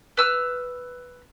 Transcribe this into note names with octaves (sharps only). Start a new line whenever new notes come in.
B4 E6 F6